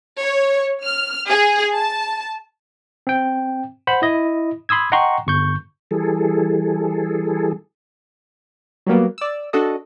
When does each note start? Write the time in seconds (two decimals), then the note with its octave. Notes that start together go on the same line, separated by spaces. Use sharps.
0.20 C#5
0.83 F6
1.29 G#4
1.76 A5
3.07 C4 G5
3.87 C5 F#5 B5
4.02 E4 D#5
4.69 B5 C6 D#6 E6 G#6
4.92 D#5 F#5 G5 A#5 C6 C#6
5.27 G1 C#6 G6
5.91 E3 G3 G#4 A4
8.87 F#3 G3 A#3 B3
9.18 D5 E6
9.53 D4 F#4 A4 D#5